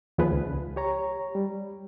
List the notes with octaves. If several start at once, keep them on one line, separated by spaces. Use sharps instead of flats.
D#2 F3 F4 G#4 B4
C#2
G4 C#5 A#5
G3